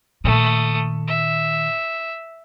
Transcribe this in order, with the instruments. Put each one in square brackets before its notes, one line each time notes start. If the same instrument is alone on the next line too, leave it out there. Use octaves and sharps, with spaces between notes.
[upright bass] A#2 D#3 [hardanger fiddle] A3 D#6
[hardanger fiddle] E5